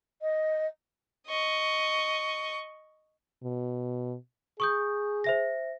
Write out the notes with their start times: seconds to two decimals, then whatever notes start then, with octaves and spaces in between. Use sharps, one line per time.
0.22 D#5
1.27 D#5 C#6
3.43 B2
4.60 G#4 C#6 D#6 G6
5.24 C5 E5 A#6